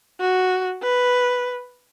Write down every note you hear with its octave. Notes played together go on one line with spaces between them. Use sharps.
F#4
B4